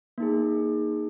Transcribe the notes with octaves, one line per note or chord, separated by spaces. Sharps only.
A#3 D#4 G#4